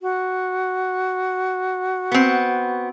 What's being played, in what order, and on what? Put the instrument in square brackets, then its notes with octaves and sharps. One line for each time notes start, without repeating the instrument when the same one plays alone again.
[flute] F#4
[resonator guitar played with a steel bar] B3 C4